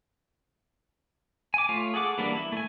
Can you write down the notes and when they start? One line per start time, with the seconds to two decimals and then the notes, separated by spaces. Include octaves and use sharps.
1.54 G#5 D6
1.69 A3 F4 C#5 F5
1.94 G#4 A4 F#5 D6
2.18 E3 G3 A#3 B3 D4
2.35 E4
2.52 A3 G#5